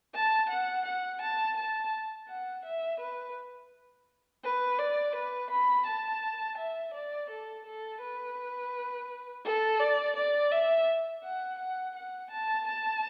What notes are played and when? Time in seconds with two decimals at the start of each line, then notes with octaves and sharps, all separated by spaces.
0.15 A5
0.50 F#5
0.86 F#5
1.22 A5
1.57 A5
2.29 F#5
2.65 E5
3.00 B4
4.44 B4
4.79 D5
5.16 B4
5.51 B5
5.87 A5
6.58 E5
6.94 D5
7.30 A4
7.66 A4
8.02 B4
9.45 A4
9.80 D5
10.17 D5
10.52 E5
11.24 F#5
11.59 F#5
11.96 F#5
12.31 A5
12.68 A5